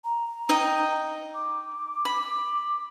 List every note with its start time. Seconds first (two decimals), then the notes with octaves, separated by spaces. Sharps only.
0.04 A#5
0.49 D#4 D#5 G5
1.35 D6
2.05 B5